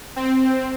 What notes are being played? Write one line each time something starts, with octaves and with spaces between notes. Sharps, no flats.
C4